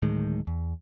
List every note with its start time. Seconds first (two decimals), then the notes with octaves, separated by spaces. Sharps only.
0.02 D1 A2 D#3 G#3
0.47 E2